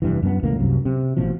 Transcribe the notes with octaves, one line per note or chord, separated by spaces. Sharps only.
F1 G2 E3
F#2 B3
E1 C#2 A2 A#3
C2 F#2 C3
C3
A1 B2 F3